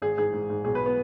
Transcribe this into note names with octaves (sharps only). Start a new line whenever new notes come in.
G#1 G#4
G#2 G#4
G#2
G#2
B1 G#4
B4
B3